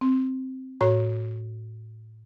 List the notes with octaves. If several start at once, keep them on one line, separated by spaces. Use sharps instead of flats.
C4
A2 F#4 C#5 A#5